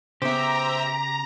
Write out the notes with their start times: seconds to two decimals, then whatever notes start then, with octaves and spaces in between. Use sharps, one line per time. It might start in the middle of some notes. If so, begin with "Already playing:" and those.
0.22 C#3 B3 G4 C5 E5 A#5